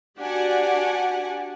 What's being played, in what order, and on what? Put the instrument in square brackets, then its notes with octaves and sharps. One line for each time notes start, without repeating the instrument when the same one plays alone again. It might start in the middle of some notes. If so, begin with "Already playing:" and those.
[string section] D4 F#4 G4 D5 F#5 G#5